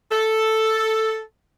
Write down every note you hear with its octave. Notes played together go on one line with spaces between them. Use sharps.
A4